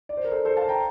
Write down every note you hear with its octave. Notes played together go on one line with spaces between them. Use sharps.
D5
C5
A#4
A4 C5
A4 C5
F5 A5
G5 A#5